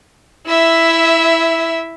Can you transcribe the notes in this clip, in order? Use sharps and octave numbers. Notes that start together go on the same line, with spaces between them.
E4 E5